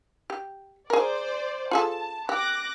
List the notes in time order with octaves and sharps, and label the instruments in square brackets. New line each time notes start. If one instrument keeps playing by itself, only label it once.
[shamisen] G4
[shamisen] G#4 A#4 [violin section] C5 D5
[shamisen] F4 G#4 A4 [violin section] A5
[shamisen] G4 [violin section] D6 F#6 A#6